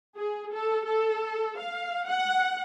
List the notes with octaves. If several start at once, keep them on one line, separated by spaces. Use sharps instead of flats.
G#4
A4
A4
F5
F#5